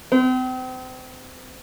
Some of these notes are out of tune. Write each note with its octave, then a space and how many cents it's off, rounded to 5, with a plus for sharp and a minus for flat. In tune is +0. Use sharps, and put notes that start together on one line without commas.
C4 -35